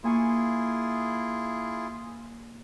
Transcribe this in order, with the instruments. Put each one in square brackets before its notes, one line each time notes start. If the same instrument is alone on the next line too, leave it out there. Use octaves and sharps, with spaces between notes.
[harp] A#3 G#5 C#6 [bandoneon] E4 F4 G#4